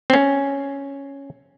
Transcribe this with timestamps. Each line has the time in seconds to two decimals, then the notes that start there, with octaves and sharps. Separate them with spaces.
0.10 C4
0.13 C#4